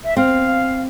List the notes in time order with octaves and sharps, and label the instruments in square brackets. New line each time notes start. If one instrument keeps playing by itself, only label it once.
[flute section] E5
[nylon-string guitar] C4 [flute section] F5